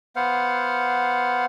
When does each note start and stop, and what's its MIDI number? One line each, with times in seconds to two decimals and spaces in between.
0.16 1.46 59
0.16 1.46 72
0.16 1.46 77
0.16 1.46 78